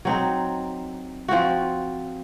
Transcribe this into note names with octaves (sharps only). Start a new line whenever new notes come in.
F#3 C4 D#4
F3 C4 F#4